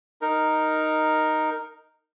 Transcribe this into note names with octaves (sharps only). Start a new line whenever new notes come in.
D#4 A#4